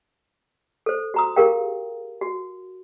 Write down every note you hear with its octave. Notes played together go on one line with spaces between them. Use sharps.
A4 C5
F#4 A#5 D#6
G4 G#4 A#4 F5 G5
F#4